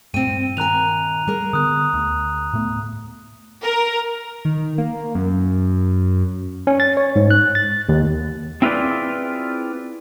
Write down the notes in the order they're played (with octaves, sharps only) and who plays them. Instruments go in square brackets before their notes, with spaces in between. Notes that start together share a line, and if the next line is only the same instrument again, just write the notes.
[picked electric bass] G2 A#2 [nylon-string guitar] C4 G5 [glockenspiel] D#7
[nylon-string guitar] D#3 G#5 [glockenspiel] A#5 F#6 F7
[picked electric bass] G3 [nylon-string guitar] G#4 A#4
[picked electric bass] D3 B3 [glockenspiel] D#6 F#6
[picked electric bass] D2
A2 A3 B3
[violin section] A#4
[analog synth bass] D#3
A#3
F#2
[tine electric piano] C#4
A6
C#5
G#2
F#6
A6
D#2
[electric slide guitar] C4 E4 F4 G#4 B4 D5